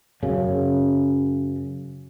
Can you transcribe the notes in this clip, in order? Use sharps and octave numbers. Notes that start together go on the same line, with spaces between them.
F#2 C#3